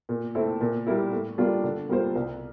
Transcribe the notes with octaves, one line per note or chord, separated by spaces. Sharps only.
A#2
A3 C4 E4 A4
A#2
G3 A#3 E4
A2
G3 A#3 D4 F4
D3
G3 A#3 F4 C5
C2